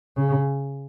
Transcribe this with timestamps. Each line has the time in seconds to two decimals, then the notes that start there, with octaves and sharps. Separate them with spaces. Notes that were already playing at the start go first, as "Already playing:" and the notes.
0.17 C#3